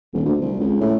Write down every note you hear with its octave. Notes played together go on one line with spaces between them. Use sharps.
D#1
D2
C2
C#2
A2